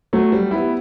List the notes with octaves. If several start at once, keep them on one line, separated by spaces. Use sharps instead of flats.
F#3 A3
G3
B3 E4